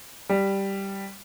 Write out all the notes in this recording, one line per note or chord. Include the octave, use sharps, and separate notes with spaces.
G3